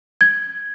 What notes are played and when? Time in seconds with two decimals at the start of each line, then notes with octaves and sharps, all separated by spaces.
0.21 G#6